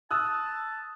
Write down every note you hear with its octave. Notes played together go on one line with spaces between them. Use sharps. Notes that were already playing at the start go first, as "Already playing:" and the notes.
A5 D#6 E6 F#6